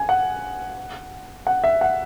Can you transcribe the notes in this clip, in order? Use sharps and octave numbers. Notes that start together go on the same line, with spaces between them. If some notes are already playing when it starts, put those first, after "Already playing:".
Already playing: G#5
F#5
F#5
E5
F#5